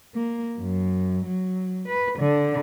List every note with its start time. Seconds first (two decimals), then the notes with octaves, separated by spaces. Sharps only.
0.15 A#3
0.59 F#2
1.26 F#3
1.88 B4
2.19 D3